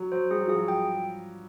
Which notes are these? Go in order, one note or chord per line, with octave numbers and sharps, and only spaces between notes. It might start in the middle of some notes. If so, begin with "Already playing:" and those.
Already playing: F#3
F#3 C5
G3 G#4
F#3
F3 G#4
F#3
G5